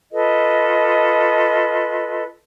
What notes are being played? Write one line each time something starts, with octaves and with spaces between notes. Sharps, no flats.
F4 A4 B4 D#5